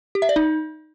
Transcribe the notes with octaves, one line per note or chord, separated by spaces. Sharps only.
G4
E5
D5
D#4